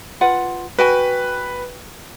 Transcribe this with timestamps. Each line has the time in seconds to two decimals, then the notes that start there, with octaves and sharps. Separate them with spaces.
0.21 F4 B4 F#5
0.79 F#4 B4 G5 G#5